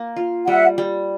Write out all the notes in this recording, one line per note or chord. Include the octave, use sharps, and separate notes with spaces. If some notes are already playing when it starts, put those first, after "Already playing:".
Already playing: A#3
F4
G3 E5 F#5
G3